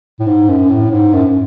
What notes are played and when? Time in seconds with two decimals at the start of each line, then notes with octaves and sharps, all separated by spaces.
0.19 A2
0.27 G#2
0.49 F#2
0.69 A2
0.91 G#2
1.13 F#2